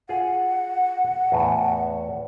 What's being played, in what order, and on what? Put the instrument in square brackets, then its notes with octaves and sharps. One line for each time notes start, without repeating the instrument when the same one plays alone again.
[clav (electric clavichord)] F4 G#4 [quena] F#5
[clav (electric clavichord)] E2 A2